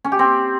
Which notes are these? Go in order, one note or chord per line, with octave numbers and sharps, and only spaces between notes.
C#4
G4
C4